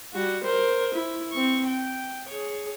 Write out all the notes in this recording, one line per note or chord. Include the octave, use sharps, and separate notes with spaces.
G3 F#4
A#4 C5
E4
C4 C#6
G5
G#4 C#5